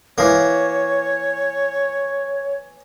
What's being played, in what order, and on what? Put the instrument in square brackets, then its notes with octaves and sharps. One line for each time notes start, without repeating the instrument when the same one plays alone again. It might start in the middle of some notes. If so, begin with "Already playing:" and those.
[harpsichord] E3 A#3 [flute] C#5